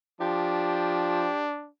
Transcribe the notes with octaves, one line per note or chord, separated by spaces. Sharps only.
F3 D4 G4